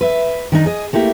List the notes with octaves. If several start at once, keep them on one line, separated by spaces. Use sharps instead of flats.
B4 E5
D#3 D4 D#4
G#4 D#5
A3 A#3 E4 G4